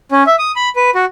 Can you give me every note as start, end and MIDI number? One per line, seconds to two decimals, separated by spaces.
0.12 0.23 61
0.27 0.36 76
0.39 0.52 87
0.56 0.69 83
0.76 0.90 71
0.95 1.05 66